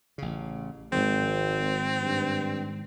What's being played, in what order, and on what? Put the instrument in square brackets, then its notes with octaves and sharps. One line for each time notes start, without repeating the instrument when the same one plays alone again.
[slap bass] A1 C#3
[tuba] G#1 [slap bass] G#2 D#3 F3 [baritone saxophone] C4
[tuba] G2